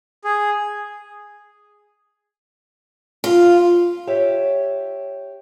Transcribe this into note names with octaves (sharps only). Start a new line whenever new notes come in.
G#4
F4
G4 C#5 E5 G5